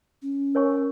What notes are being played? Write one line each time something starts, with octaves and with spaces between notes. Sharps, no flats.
C#4
A#4 C#5 G#5 C#6